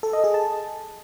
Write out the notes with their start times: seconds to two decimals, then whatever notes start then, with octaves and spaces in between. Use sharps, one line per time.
0.03 A4
0.13 D#5
0.24 G#4
0.34 A5